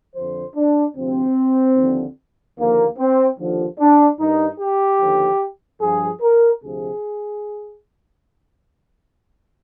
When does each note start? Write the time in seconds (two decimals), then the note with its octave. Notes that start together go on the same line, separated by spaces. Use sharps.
0.15 F2 D3 F3 C5
0.56 D4
0.96 D2 C3 F3 C4
1.76 D#2 D3 F3
2.58 D#2 D3 F3 A#3
2.98 C4
3.39 D#2 D3 F3
3.79 D4
4.19 G2 D#3 D#4
4.59 G4
5.00 D#2 D3 F3
5.81 G2 F3 G#4
6.22 A#4
6.62 D2 C3 F3 G#4